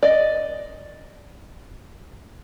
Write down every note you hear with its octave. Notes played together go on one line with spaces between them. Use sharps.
D5 D#5